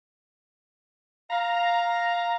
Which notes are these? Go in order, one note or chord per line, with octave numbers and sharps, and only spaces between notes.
F5 A#5